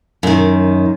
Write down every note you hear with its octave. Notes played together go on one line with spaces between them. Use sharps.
F#2 D#3